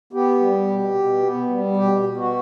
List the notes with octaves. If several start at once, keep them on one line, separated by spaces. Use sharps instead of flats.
B3 G4
G3
B2
B2
B3
G3
B2 G4
B2
F#4